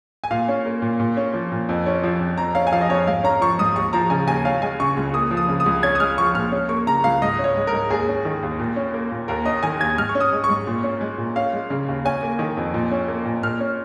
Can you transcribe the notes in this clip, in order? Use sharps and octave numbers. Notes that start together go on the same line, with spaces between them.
G#5
A#2 F5
C#4
A#3
A#2
A#2
C#4
F3
A#2
F2
C#4
F3
F2
F2 A#5
C#4 F5
G#5
F3 F5
D#5
F2 C#5
G#2 F5
C#4 A#5
F3 C#6
G#2 D#6
D#2 C#6
F3 A#5
C#3 G#5
D#2 G#5
C#4 F5
G#3 G#5
C#3 C#6
C#2
A#3 D#6
F3
D#6
C#3
D#6
C#2
C#4 G#6
D#6
G#3 F6
F3 C#6
A#2 F6
C#4
A#3 C#6
C#3 A#5
C#2 F5
G#2 D#5
C#4
C#5
G#3
A#4
G#2
D#2 G#4
C#4
D#3
D#2
A#2
C#4
A#3
A#2
D#2 A#4
C#4 D#5
D#3 G#5
D#2 G#6
G#2 F6
C#6
C#4
D#6
G#3
C#6
G#2
A#2
C#4
G#3
A#2
C#4 F5
G#3
C#3
D#2
C#4 G#5
A#3
D#3
F2
A#2
C#4
A#3
A#2
A#2 F6
C#4